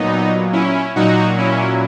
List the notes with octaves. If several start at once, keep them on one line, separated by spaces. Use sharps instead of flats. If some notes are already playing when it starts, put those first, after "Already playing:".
Already playing: A#2 F#3 B3 D#4
C#4 E4
A#2 F#3 D#4 F#4
C#4 E4